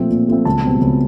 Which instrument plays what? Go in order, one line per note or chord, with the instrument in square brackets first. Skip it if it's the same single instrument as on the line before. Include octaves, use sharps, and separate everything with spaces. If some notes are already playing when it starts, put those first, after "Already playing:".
Already playing: [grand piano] A#2 F3 A3 C4
A#2
F3 A3 C4
C#2 A5
B2 G3 C4
C#2